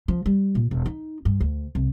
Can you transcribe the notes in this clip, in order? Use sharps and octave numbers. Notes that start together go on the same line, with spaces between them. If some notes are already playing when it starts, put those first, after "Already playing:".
F3
G3
A#2
E1
D#4
G2
D2
C2